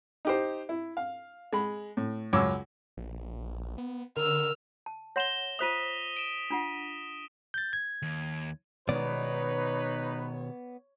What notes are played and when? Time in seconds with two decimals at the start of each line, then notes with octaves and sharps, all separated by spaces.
0.25 D#4 G4 C5
0.69 E4
0.97 F5
1.53 G#3 B5
1.97 A2
2.33 C#2 F#2 C#5 D6 E6
2.97 A#1
3.78 B3
4.17 D3 A#4 E6 F6
4.86 A5
5.16 C#5 F#5 C6 A#6 E7 G7
5.59 F4 C5 E5 D#6 B6 D#7
6.17 D7 E7
6.50 D4 F4 F#5
7.54 G6 A6
7.73 G#6
8.02 D#2
8.89 B2 D#3 G#3 B3 D#4 B4 C#5 D5